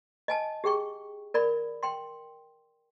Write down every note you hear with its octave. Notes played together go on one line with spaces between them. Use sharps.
D#5 G#5 A5
G4 G#4 G5 C#6
A#4 D5 B5
G5 C6